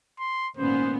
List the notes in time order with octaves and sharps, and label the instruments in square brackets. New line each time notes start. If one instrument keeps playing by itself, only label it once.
[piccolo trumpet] C6
[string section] G#1 A#2 B3 [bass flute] C#4 [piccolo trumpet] C5